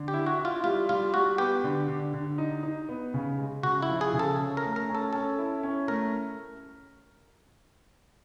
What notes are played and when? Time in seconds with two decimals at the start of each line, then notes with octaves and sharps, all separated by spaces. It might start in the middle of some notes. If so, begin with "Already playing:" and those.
Already playing: D3
0.08 G4
0.13 E4
0.26 F#4
0.39 E4
0.45 F4
0.64 G3 F4
0.89 G3 F4
1.14 G3 F#4
1.38 B3 G4
1.64 D3
1.88 D3
2.14 D3
2.38 D#4
2.63 D#4
2.89 B3
3.14 C#3
3.38 G#3
3.63 C#3 F#4
3.83 E4
3.89 F3
4.01 G#4
4.13 C#3
4.19 A4
4.39 C#4
4.57 A#4
4.64 A3
4.76 A#4
4.89 C#4
4.95 A4
5.13 C#4 A4
5.38 E4
5.63 C#4
5.88 A3 A#4